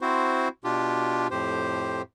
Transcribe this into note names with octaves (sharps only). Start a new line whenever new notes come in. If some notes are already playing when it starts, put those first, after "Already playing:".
C4 E4 F#4 C5
B2 D4 F4 G4
F2 A2 G4 C5